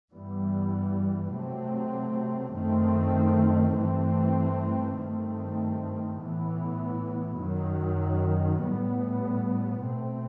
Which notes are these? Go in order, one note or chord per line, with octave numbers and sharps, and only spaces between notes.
G2 E3 G3 B3
C3 F#3 A3 C4
F#2 D#3 A3 C4
G2 E3 A3 C4
G2 D#3 A3 C4
A2 E3 B3
F#2 D#3 F#3
A2 G3 B3
B2 A3 C4